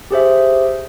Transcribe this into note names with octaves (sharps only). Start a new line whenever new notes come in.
G4 G#4 C5 E5